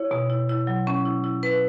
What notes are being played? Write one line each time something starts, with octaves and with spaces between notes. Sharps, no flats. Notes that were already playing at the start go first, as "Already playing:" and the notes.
Already playing: E4 C#5
B2
E4
E4
F#3
C#4
E4
E4
E4 B4